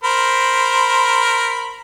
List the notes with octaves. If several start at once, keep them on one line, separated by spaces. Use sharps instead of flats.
A#4 C5 B5